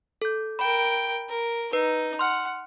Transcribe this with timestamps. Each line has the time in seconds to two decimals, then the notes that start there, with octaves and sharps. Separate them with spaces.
0.22 A4 G6
0.59 A#4 G5 B5
1.29 A#4
1.73 D#4 B4
2.19 F#5 C6 F6